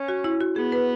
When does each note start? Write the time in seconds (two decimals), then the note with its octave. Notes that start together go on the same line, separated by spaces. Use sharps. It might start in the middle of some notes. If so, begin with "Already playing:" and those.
Already playing: C#4
0.08 F#4
0.24 E4
0.41 F#4
0.56 B3 G#4
0.72 B4